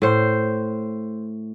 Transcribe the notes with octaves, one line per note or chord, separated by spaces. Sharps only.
A2 C5